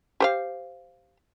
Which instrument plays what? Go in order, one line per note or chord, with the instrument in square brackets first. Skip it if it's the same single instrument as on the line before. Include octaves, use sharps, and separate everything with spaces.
[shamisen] G4 C5 F5